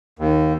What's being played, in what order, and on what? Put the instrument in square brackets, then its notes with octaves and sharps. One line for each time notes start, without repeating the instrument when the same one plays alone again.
[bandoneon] D#2